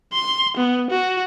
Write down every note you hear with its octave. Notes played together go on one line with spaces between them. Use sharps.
C6
B3
F#4